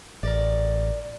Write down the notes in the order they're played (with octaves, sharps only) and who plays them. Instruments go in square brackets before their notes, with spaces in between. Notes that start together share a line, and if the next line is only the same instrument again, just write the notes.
[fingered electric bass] A1 [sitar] A#4 D5